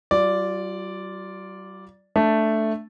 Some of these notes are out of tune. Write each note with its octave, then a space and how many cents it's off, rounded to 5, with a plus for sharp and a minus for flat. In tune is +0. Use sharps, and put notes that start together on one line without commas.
G3 -45 F4 +0 D5 -5
A3 +0 D4 +0 A5 +0